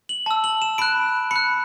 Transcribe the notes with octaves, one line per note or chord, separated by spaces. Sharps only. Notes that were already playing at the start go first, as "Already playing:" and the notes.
F#7
A5 E6
F#7
E7
B5 F#6 D7
B5 F#6 C#7